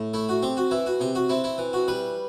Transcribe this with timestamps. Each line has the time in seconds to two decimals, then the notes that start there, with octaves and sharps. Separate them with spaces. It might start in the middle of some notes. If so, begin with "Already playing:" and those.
Already playing: A2
0.14 A3 E4
0.29 F#4
0.43 C4 G4
0.57 F#4
0.71 E3 E4
0.86 F#4
1.00 C3 G4
1.15 F#4
1.29 C4 E4
1.44 E4
1.58 E3
1.73 F#4
1.88 G3 B4